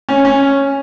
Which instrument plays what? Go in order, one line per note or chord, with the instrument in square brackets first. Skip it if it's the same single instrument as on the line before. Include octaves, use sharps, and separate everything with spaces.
[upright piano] C#4
C#4